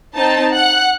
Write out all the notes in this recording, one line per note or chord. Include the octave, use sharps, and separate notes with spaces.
C4 D#4 A5
F#5 F#6